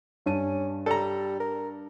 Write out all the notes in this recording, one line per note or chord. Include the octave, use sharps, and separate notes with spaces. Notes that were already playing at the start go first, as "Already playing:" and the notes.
G2 C#4 A5 D#7
G3 A4 A#5
A#4